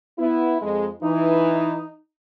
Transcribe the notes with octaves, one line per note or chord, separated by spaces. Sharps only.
B3 E4
F2 G#3
E3 D#4